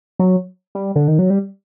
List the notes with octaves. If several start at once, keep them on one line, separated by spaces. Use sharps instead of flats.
F#3
G3
D3
D#3
F#3
G3